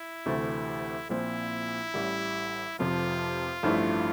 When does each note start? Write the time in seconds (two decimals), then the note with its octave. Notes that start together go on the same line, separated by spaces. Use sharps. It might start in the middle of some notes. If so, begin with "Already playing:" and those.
Already playing: E4
0.26 D2 C3 E3 A3
1.09 A#1 A#2 F3 C4 E4
1.94 A1 A2 G3
2.79 F1 F2 C3 F3 F4
3.63 A1 G2 F3 A3 E4